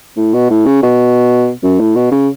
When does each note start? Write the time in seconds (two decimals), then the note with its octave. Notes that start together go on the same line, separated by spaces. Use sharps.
0.17 A2
0.34 B2
0.50 A2
0.66 C#3
0.83 B2
1.63 F#2
1.80 A2
1.96 B2
2.12 C#3